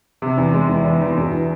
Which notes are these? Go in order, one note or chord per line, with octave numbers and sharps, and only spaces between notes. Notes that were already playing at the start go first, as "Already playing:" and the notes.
C3
E2
G#3
E2
E2
E2
E1
E3